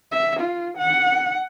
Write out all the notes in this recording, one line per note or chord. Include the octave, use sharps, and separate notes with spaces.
E5
F4
F#5